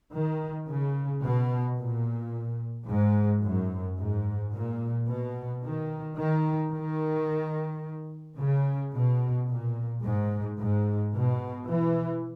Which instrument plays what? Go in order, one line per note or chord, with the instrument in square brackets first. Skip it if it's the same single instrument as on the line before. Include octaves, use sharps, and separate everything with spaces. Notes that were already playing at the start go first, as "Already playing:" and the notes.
[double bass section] D#3
C#3
B2
A#2
G#2
F#2
G#2
A#2
B2
D#3
D#3
D#3
C#3
B2
A#2
G#2
G#2
B2
E3